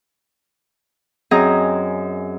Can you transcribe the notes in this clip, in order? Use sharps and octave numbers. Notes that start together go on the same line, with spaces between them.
F#2 C4 G#4 D#5 A#5